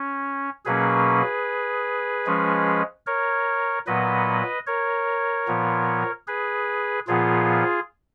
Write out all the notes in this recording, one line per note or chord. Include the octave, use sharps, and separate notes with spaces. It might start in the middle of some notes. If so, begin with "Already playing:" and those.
Already playing: C#4
B2 F#3 A#3 C#4 G#4 B4
F3 G#3 C#4
A#4 C#5
A#2 F#3 B3 B4 D#5
A#4 C#5
A#2 F3 B3
G#4 B4
A#2 F3 B3 F4 G#4